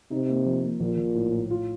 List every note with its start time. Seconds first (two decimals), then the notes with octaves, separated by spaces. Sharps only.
0.11 C3 D#4
0.29 A#3
0.46 F3
0.63 A#3
0.80 A#1 A#2
0.97 A#1
1.15 A2
1.32 A2
1.50 F4